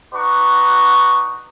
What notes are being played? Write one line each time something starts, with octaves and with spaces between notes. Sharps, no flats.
D#4 F#4 B4 D5 C#6